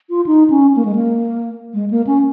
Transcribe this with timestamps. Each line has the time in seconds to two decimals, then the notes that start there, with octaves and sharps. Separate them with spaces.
0.10 F4
0.26 D#4
0.50 C#4
0.76 A#3
0.85 G#3
0.95 A#3
1.74 G#3
1.91 A#3
2.07 C#4